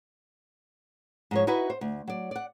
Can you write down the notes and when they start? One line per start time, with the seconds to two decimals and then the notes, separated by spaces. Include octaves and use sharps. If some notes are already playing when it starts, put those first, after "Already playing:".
1.31 G#2 F3 C#5
1.47 D#4 E4 F#4 B4 E5
1.70 C5
1.81 D2
2.08 F#3 D5
2.31 D5 F#5